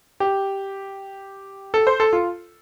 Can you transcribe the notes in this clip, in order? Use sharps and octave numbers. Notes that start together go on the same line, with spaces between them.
G4
A4
C5
A4
F4